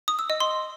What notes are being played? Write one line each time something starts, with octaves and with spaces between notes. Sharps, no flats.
D#6
E6
D#5
C6